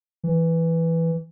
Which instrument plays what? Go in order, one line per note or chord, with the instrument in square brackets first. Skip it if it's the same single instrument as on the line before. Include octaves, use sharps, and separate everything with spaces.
[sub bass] E3